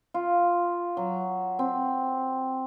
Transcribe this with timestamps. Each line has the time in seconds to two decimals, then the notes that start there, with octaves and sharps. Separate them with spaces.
0.14 F4
0.97 F#3
1.59 C4